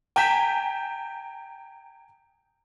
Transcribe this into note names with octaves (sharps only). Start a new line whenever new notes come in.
G5 G#5 A#5 G6 B6 E7